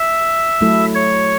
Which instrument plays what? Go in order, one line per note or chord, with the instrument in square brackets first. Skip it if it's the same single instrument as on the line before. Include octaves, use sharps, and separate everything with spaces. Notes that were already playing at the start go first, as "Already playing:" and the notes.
Already playing: [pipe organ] E5
[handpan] F#3 A3 E4 A4
[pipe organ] C#5